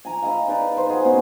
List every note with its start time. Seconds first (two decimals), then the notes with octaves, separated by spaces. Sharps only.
0.05 G#5 A#5
0.22 E4 G#4 D#5 F5
0.48 D#4 G#4 B4 D5
0.77 C5
0.89 F#4 G#4 D#5
1.05 B2 C#4 G#4